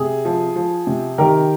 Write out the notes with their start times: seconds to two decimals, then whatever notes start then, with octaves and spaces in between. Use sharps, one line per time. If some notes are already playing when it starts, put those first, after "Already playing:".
Already playing: C3 G#4
0.25 F3
0.56 F3
0.87 C3
1.18 D#3 G4 A#4